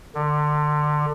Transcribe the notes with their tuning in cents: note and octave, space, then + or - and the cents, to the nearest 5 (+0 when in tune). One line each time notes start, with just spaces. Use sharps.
D3 +25